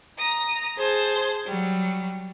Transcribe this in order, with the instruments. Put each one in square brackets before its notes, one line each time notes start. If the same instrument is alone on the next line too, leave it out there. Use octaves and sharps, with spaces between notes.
[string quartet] A#5 D#6
G#4 C5 A5
F#3 G3